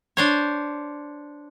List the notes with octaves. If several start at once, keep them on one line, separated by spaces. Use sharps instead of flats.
D4 C5 C#5